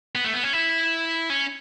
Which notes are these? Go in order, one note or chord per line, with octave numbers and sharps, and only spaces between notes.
B3
A3
B3
C#4
E4
C#4